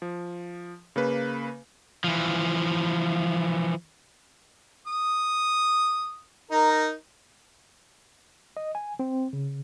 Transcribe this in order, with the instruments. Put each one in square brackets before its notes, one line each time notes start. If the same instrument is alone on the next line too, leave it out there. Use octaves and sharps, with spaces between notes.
[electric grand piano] F3
C#3 A#3 B4
[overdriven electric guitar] E3 F3
[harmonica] D#6
D#4 A#4
[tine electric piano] D#5
G#5
C4
C#3